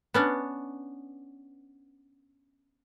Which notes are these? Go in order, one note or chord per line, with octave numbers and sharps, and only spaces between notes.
B3 C#4 D4